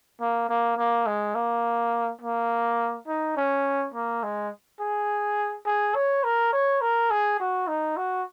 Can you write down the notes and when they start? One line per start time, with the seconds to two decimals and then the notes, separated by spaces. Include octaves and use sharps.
0.20 A#3
0.49 A#3
0.77 A#3
1.06 G#3
1.35 A#3
2.21 A#3
3.07 D#4
3.37 C#4
3.94 A#3
4.23 G#3
4.80 G#4
5.66 G#4
5.95 C#5
6.24 A#4
6.53 C#5
6.81 A#4
7.10 G#4
7.40 F#4
7.68 D#4
7.97 F#4